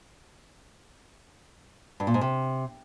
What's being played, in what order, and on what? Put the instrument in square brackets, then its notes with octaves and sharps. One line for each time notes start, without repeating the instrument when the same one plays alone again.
[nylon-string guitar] G2
A#2
G#2
C3